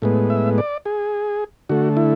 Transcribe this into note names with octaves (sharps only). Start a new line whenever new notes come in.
A2 G#3 B3
E5
D5
G#4
D3 A3 F#4
E4